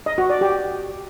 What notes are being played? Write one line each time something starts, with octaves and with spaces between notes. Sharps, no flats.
D#5
F#4
D5
G4